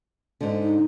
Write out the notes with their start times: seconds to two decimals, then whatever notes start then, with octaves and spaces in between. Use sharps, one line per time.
0.41 G#2 D3
0.63 D#4